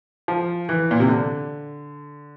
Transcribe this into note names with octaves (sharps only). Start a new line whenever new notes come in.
F3
E3
A#2
C3
D3